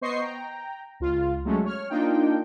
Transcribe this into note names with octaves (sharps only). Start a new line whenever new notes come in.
B3 C5 D#5 C#6 C7
G5 A#5
C#2 F4
F#3 G#3 A3 C#4
C#5 F6
A#3 D4 D#4 F4 G5